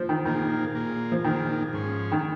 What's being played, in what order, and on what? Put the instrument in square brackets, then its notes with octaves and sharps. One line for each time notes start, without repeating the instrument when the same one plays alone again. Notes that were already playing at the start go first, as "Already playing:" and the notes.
Already playing: [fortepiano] F3
D#3
[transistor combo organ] A#2 A#3 F4 G#4 [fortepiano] D#3
[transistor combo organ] A#2 A#3 F4 G#4
[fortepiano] F3
[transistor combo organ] A#2 A#3 F4 G#4 [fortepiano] D#3
[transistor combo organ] G#2 F3 C#4 G#4
[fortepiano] D#3